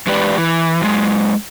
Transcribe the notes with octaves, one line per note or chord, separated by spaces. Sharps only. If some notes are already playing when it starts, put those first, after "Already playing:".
E2 G#3 G4 B4 D5
E3
F#2 G#3